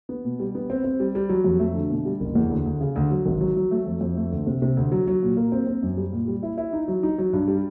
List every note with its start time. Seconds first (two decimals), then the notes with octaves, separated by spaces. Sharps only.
0.09 B3
0.25 B2
0.40 G3
0.55 B3
0.70 C4
0.84 C4
1.00 G3
1.15 G3
1.29 F#3
1.44 F2
1.59 A3
1.75 D3
1.90 B2
2.05 G3
2.20 F#1
2.35 E2
2.50 D2
2.66 D2
2.81 C#3
2.96 D2
3.11 F#3
3.26 G#1
3.41 F#3
3.56 F#3
3.71 A3
3.86 F2
4.01 F2
4.17 A3
4.32 D2
4.47 C3
4.62 C3
4.77 D2
4.92 F#3
5.07 F#3
5.22 A#2
5.37 A#3
5.52 C4
5.67 C4
5.83 F#2
5.97 G3
6.13 A#2
6.27 G3
6.43 E4
6.58 E4
6.73 D#4
6.88 F#3
7.03 D#4
7.18 F#3
7.33 G2
7.48 G3